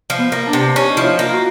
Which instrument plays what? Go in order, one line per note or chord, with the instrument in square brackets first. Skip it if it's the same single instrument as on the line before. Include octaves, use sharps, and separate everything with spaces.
[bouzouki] F3
[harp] B3
[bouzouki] A#3
[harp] D4
[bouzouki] C3
[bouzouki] C#4 [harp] D#4
[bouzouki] F3 [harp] E4
[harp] F4
[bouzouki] A#3
[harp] F4
F#4